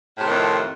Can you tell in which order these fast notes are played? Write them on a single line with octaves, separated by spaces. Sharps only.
A2 C3 D#3 F2